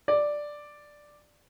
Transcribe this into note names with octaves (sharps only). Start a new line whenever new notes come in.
D5